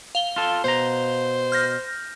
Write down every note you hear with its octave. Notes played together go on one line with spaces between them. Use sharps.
F5 G7
F4 A4
B2 C5 A#5
F6 G6 A#6